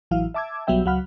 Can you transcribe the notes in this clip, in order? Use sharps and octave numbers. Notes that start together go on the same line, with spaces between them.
A1 E3 F#3 E4 F5
E5 A5 D6 E6 G#6
B1 F#3 G3 B3 E5 G5
C#2 F#3 F5 F#5 B5 F6